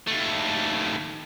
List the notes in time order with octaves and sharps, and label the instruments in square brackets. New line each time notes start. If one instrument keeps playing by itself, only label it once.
[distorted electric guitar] D#2 A3